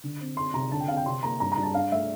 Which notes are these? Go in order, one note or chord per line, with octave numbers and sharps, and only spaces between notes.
D3
C4
C4 C6
C3 A#5
D3 A5
G5
C4 F5
G5
C3 C6
A#3 A#5
G2 A#5
A#5
G2
A5
D4 F5
A3 E5